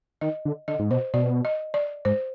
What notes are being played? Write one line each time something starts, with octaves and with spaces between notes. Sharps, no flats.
D#3 D#5
D3
D3 D#5
G#2
B2 C5
B2 D5
D#5
D5
G#2 C5